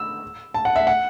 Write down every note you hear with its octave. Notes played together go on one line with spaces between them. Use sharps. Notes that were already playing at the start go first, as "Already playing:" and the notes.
Already playing: E6
A5
F#5
E5
F#5